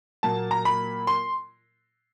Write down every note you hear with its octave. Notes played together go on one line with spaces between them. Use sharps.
A#2 F#3 A#3 A5
A#5
B5
C6